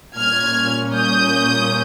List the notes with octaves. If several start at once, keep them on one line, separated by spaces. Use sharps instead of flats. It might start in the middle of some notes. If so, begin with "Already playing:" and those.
A#2 G3 A#3 C#4 F6 G#6
D#6 G6